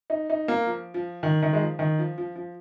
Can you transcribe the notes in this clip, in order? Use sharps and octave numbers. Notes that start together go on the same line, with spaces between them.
D#4
D#4
A#3
F3
F3
D#3
D#3
G#3
F3
D#3
F3
F3
F3